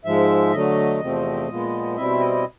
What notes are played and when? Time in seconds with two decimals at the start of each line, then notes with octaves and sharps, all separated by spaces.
0.05 G#2 F3 G#3 E5
0.52 D3 F#3 A3 D#5
1.00 E2 C3 F3 A3 C4
1.48 A#2 F3 G#3 B3
1.96 B2 G3 C4 E4 E5
2.20 D#5